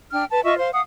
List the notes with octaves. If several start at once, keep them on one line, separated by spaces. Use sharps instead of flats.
D4 G5 F6
B4 A5
F4 D#5 E5 C#6
C5 F5 C6
F5 F#5 D#6